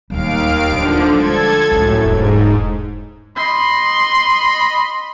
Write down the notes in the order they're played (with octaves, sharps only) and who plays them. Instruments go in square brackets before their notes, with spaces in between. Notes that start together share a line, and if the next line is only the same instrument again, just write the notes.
[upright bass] D1 G3 [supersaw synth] D#2 F5 D7
[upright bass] D1 [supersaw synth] D3 F3
[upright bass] G3 G#3 [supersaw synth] A4 G#6
[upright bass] C#2 C#4 [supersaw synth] F#2 A2
[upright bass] E1 [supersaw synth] G#2
[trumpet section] D#5 B5 [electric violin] C6